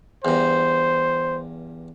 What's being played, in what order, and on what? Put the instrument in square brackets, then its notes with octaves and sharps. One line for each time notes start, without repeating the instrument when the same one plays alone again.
[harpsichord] E2 G2 [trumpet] C5